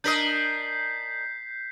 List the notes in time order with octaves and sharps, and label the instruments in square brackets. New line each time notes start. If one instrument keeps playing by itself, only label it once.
[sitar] D4 A#4 D#5 [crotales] G6 B6 C7